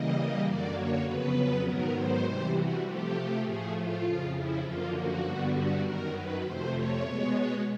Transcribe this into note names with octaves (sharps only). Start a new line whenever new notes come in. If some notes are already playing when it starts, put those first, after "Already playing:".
Already playing: C#3 E3 G3 A#3 D#5
F#2 D3 F#3 A#3 D5
C#5
F2 C#3 F#3 B3 B4
G#2 D#3 F#3 B3 A#4
C5
C3 E3 G3
F#4
C3 F3 A3 G4
A2 F3 A3 G#4
F4
F2 C#3 F3
E4
F#2 D3 F3 A#3 F4
F#4
G2 D3 G3 B3
F#4
F#2 D#3 F#3 A#4
B4
F2 C3 F3 A3 C5
C#5
B2 G#3 B3